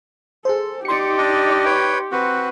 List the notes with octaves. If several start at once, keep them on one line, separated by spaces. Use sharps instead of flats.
G#4 A4 C5
D#4 G4 D5 C6 C#7
D4 D#5
B4 C#5 G5
C4 F#4 B4